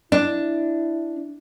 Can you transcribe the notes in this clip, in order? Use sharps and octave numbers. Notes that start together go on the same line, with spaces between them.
D4 E4